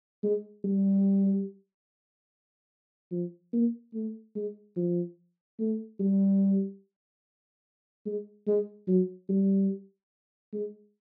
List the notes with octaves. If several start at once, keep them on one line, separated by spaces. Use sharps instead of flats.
G#3
G3
F3
A#3
A3
G#3
F3
A3
G3
G#3
G#3
F#3
G3
G#3